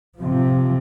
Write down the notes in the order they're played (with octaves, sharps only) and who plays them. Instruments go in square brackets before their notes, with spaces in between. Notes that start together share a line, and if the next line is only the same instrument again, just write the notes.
[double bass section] C3 F3